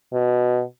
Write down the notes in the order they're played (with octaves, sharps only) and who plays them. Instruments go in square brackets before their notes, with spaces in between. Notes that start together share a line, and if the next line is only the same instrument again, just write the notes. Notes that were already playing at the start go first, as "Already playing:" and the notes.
[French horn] B2